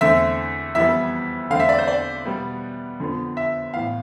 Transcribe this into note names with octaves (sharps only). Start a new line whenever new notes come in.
E2 D3 A3 C4 E5
F2 E3 G3 B3 E5
E2 D3 A3 C4 F5
E5
D5
C5
D5
B2 G3 B3
F2 D3 F3 B3
E5
A2 E3 B3 F5